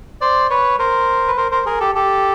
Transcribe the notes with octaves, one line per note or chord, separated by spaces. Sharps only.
C5 D5
B4 C#5
A#4 C5
B4
A#4 C5
A#4 C5
G#4 A#4
G4 A4
G4 A4